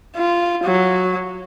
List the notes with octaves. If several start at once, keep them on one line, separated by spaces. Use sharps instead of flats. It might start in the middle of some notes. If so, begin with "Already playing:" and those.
F4
F#3